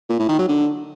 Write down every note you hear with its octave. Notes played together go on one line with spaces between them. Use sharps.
A#2
A2
D#3
F#3
D3